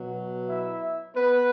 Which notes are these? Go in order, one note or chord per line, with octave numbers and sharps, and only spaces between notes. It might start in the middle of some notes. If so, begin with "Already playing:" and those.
Already playing: B2 F#3
E4 E5
B3 B4